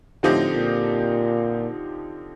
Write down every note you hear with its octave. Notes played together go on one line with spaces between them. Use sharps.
A2 D3 F3 C4 D#4 G4
A#2